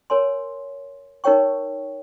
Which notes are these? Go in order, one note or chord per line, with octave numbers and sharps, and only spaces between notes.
A#4 C#5 G#5 C6
D#4 A#4 C#5 G5 C#6